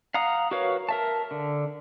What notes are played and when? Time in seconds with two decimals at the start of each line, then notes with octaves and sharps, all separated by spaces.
0.14 F5 F#5 A#5 D#6
0.51 F#4 A#4 B4 C#5 F5
0.89 A#4 E5 A5
1.31 D3